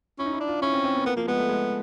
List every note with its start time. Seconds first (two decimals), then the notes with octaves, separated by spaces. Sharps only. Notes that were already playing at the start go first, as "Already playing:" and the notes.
0.19 C#4 E4
0.26 D#4
0.33 E4
0.40 D4
0.48 F4
0.62 C#4 E4
0.73 C4
0.84 C4
0.95 B3
1.05 A#3 B3
1.17 F3 A#3
1.27 G#3 B3
1.38 A3
1.49 G#3